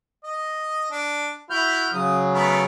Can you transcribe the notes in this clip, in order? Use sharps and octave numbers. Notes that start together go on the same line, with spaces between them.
D#5
D4
E4 F#4 F6 G6
C#3 F#3 D#6
A3 B3 A#4